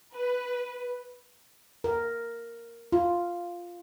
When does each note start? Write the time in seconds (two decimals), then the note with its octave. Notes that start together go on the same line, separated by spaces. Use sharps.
0.14 B4
1.84 A#4
2.92 F4